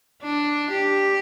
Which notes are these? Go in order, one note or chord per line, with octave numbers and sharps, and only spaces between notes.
D4
G4